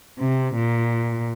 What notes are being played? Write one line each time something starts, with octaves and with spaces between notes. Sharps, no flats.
C3
A#2